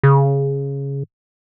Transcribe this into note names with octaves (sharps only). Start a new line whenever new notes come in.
C#3